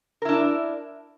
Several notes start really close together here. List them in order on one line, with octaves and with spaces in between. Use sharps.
A#4 E4 D4